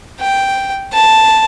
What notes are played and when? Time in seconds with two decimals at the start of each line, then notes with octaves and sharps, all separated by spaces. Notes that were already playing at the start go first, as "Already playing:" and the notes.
0.21 G5
0.93 A5